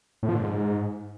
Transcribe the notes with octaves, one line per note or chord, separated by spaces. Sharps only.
A2
F3
D3
G#2